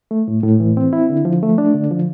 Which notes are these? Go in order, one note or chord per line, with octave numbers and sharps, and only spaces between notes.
A3
A2
A2
E3
C4
E4
D3
F3
A3
D4
D3
F3